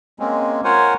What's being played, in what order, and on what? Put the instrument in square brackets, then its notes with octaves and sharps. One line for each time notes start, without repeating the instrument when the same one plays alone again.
[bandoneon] G#3 A#3 C4 C#4
F4 A#4 C5 C#5 F#5 G#5